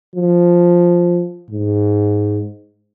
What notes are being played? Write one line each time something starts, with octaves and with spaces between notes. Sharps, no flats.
F3
G#2